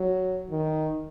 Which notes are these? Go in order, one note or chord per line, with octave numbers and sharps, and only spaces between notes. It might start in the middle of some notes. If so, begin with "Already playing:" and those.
Already playing: F#3
D#3